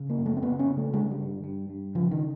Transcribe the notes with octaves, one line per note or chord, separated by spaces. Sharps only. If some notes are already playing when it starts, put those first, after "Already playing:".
Already playing: C#3
A#3
F#2
A3
C4
C#3 B3
C#4
C#3
A3
D3 G#3
G3
G2
G2
G2
C#3 F3
D#3